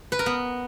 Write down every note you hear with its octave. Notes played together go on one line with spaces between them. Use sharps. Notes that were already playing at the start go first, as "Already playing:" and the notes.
B4
A#4
B3